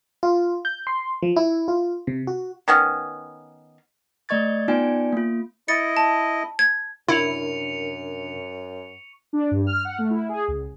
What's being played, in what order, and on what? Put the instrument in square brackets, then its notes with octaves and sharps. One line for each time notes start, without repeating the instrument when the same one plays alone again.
[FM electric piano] F4
G6
C6
F3
E4
F4
C3
F#4
[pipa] D#3 B3 C#4
[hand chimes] A3 D5 D#5 C#6 G#6 A6
B3 D#4 F4 D5 G5 G#5
A#3 F4
[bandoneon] E4 D#5 [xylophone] A6 C#7
[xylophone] A5
G#6
[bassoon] F#2 [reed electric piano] C3 D4 A#4 [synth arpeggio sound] E4 [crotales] C#6 C#7 F7
[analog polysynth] D4
G2
F6
F#5
A3
E4
G#4
C#2